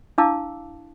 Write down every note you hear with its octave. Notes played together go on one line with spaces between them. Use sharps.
D4 E4 F5 A5 D6 E6